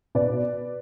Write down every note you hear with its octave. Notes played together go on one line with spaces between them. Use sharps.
B2 B4 D5